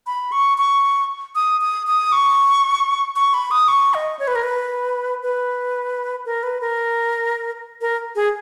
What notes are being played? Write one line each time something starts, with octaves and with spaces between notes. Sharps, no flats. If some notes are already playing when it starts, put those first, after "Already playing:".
B5
C#6
C#6
D#6
D#6
D#6
C#6
C#6
B5
D#6
C#6
D#5
C#5
B4
A#4
B4
B4
A#4
B4
A#4
A#4
G#4